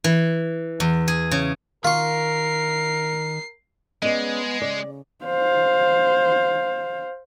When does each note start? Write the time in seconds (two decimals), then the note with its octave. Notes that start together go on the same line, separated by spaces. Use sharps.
0.04 E3
0.80 E2
1.08 G#4
1.31 C#3
1.85 D#3 F4 A#4 C#6 C7
4.02 G#3 B3 C#4 D5 D#5
4.62 C#3 D5
5.25 C5 F5